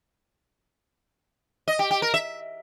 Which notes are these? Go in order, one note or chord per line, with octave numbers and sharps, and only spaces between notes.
D#5
G4
G4
A#4
E5